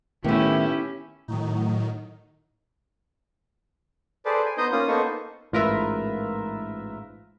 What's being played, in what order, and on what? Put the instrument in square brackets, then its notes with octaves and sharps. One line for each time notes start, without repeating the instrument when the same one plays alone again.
[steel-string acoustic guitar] A2 A3 [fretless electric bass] D#3 B3 [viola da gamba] C#4 E4 G4
[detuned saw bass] A2 [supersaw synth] D#3 F#3 D#4
[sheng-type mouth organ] G#4 A4 B4 C5 D5
G#5
B3 D#4 C5 D#5 D#6 G6
A#3 C#4 F4 D#6
A#3 B3 D#4 A4 C5 C#6
[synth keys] A1 G#2 F4 A#4 B4 E5